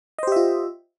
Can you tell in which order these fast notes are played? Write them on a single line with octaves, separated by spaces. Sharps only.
D#5 C5 G4 E5 F4